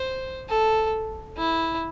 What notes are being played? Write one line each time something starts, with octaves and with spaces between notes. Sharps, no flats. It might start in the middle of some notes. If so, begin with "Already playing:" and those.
Already playing: C5
A4
E4